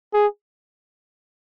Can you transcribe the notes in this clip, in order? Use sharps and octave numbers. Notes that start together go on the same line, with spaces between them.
G#4